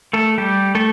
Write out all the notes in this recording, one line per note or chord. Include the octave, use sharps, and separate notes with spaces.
A3 A4
G3 G4
A3 A4